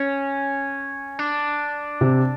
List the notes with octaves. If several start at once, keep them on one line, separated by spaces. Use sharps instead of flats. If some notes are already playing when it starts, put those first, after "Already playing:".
Already playing: C#4
D4
C3